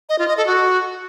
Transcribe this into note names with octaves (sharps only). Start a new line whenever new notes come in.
D#5
F4
D#5
A4
F#4